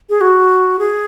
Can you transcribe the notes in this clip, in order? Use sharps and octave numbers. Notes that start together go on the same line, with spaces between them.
G#4
F#4
G#4